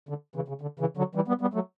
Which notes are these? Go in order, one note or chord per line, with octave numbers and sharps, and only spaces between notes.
D3
C#3 E3
C#3
D3
C#3 E3
D3 F#3
E3 G3
G3 B3
G3 B3
F#3 A3